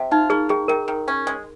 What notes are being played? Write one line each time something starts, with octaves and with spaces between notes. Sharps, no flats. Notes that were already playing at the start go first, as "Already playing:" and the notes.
Already playing: C3
D#4 F4
A#3 G#4
D#3 G#4
D#3 A#4
D#3
C#4
G#3